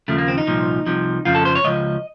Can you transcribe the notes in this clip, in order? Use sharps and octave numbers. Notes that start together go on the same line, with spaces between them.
D#2 C#3 F3 A3
A#3
C4
D#4
C2 A#2 F3
C2 C3 F3
F2 C#3 F3 F4
A4
C5
C#5
C#2 C#3 F3 D#5